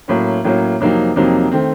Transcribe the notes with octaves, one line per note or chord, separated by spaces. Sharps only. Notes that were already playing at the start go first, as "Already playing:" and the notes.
A2 F#3 A#3 C#4
A2 F#3 A#3 C#4
F2 C3 F#3 A#3 D#4
F2 C3 F#3 A#3 D#4
D#3 A3 C4